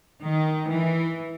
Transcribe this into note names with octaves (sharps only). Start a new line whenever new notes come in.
D#3
E3